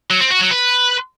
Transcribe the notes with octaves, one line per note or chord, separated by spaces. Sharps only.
F#3
C4
F#4
F#3
B4